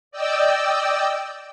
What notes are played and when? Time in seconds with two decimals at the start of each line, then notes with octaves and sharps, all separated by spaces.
0.11 D5 D#5 G5 E6